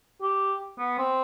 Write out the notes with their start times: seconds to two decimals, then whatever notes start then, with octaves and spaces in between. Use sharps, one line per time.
0.22 G4
0.78 B3
0.98 C4